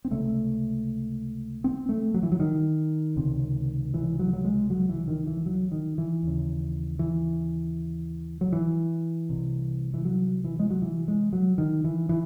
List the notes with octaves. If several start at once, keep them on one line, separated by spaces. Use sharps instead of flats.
C4
C#2 C3 A3
C4
A3
F#3
E3
F#3
D#3
C#2 C3
E3
F#3
F#3
G#3
F#3
E3
D#3
E3
F#3
D#3
E3
D#2 C#3
E3
F#3
E3
C2 C3
E3
F#3
E3
G#3
F#3
E3
G#3
F#3
D#3
E3
E3